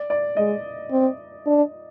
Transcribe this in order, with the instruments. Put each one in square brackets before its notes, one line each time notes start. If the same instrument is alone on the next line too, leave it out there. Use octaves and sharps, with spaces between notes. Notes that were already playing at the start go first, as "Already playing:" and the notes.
Already playing: [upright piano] D5
D5
[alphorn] G#3 [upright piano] D#5
[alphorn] C4
D4